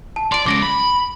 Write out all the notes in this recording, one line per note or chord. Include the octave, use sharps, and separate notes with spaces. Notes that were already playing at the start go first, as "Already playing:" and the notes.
A5
D5 C6 D7
C#3 G#3 D6 A#6 D7
B5